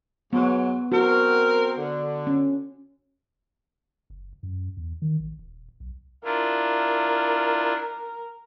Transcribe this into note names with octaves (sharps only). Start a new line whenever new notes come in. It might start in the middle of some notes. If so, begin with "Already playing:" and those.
G#2 F#3 B3
C4 F#4 A#4
D3
C#4
F#1
F#2
E2
D#3
A1
D#1
B1
D4 E4 F4 A#4